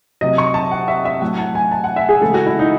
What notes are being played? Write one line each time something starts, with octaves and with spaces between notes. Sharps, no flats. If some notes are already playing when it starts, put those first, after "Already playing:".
C3 F#3 D#5
C#6
A5
F#5
E5
E5
A2 F#3 F#5
A5
G#5
A5
F#5
E5
G#4
C#3 E3 G#3 A4
F#4
E4
D#4